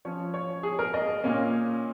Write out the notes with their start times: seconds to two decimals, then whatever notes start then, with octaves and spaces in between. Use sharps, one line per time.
0.05 F3 C#4 C#5
0.34 C#5
0.63 G#4
0.79 A#4
0.94 D#5
1.24 A#2 A#3 C#4